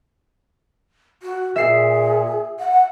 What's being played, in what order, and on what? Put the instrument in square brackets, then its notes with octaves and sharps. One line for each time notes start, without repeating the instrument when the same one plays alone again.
[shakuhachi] F#4
[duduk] A#2 [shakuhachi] G#4 [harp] E5 C7
[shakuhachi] F#5